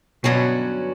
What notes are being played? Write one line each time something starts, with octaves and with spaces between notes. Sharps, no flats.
G2 B2 D3 F#3 C#4 F#4